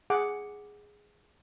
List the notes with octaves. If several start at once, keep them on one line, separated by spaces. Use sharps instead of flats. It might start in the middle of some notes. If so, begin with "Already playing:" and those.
G#4 F#5 D6